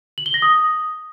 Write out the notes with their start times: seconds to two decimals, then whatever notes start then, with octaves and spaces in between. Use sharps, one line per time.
0.18 F#7
0.26 G7
0.34 A#6
0.42 D#6